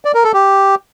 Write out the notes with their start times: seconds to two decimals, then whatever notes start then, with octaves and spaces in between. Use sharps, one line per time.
0.05 D5
0.14 A#4
0.24 A4
0.33 G4